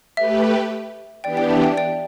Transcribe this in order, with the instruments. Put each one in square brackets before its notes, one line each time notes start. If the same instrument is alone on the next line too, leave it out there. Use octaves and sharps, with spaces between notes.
[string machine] A3 G4 B4 [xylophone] E5
[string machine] E3 B3 D4 G4 [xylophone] D5 G5
[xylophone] D5 G5
E5 A5
D5 G5
D5 G5